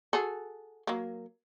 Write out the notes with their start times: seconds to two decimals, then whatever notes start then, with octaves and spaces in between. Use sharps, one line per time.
0.13 F#4 G#4 A4
0.87 F#3 A#3